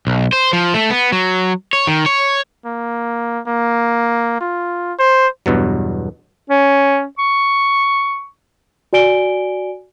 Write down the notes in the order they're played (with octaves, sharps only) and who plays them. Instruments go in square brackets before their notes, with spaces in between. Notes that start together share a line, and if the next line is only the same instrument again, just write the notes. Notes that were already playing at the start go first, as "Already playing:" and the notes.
[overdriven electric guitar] B1
C5
F3
A3
B3
F#3
C#5
D#3
C#5
[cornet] A#3
A#3
F4
C5
[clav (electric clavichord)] E2 G2 B2 F#3
[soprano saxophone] C#4
C#6
[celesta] F#4 D5 G#5 D7 G7